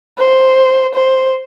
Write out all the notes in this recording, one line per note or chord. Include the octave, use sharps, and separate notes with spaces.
C5
C5